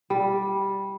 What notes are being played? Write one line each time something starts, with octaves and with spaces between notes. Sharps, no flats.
G3